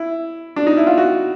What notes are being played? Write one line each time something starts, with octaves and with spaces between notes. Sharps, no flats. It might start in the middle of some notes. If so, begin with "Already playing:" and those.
Already playing: E4
D4
D#4
E4
F4
F#4